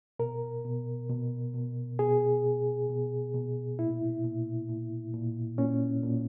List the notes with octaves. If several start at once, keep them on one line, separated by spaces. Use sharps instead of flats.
B2 A#4
B2
B2
B2
B2 G#4
B2
B2
B2
A#2 E4
A#2
A#2
A#2
A#2 C#4
A#2